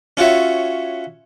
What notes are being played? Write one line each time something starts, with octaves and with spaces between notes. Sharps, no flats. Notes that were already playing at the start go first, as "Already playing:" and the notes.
C#4 F4 F#4 C#5 E5